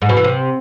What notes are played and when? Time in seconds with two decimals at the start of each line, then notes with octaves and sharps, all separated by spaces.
0.02 G#2
0.09 B2
0.17 E3
0.24 C3